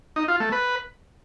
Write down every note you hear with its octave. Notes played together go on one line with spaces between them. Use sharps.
D#4
F4
A3
B4